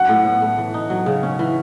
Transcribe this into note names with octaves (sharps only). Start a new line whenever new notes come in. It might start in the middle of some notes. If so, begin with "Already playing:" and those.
Already playing: F#3 C#4 F#5
A2
B3
A3
E3
D#4
F#3
C#3
C#4
E3